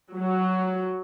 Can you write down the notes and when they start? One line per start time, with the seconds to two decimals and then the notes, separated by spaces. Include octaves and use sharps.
0.15 F#3